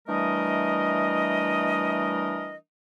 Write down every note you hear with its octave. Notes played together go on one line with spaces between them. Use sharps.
E3 G3 A3 D4 A#4 D#5